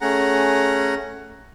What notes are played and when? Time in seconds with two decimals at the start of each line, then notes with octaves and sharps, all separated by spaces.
0.01 A3 C#4 G#4 F#5 A#5